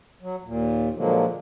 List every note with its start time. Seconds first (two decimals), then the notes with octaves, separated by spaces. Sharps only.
0.22 F#3
0.44 D#2 A#2
0.96 A#2 D3 F3 F#3 G#3 A#3